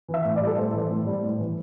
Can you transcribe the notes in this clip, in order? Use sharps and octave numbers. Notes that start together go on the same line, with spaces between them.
E3
E5
A2
D5
G3
A4
A2 C5
E3
A2
G3
A2
E3